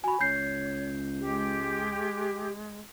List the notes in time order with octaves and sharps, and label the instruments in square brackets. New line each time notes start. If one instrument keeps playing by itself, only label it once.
[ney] F#4 [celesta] G#5 B5
[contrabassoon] C#2 [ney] C#5 [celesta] G6 C7
[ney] G#3 [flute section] G4